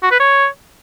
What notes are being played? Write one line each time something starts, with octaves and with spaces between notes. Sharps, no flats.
F#4
B4
C#5